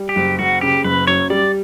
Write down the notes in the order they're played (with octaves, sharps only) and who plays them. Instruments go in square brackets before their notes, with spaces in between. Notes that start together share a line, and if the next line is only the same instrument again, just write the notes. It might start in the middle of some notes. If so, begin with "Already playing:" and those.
Already playing: [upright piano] G3
[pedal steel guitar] G4
[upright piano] F#1
[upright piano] F#1 [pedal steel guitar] F#4
[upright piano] C#3 [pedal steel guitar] G4
[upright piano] F#1 [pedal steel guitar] B4
[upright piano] F#2 [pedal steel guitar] C#5
[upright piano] G3 [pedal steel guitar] D5